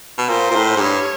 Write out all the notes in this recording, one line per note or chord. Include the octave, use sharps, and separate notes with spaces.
B2
A#2 C5
A#2
A2
G#2
G2 C#5